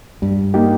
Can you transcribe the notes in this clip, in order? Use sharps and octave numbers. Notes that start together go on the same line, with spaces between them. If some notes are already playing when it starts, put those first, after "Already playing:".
G2 G3
A#3 D#4 G4